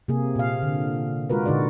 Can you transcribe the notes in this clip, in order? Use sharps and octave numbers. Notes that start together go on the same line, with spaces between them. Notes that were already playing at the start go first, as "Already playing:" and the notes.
C3 A#3 G#4
A#2 F5
D3
G#3 F4 F#4 A#4 B4
A#2 D3 D#4 F#4 D5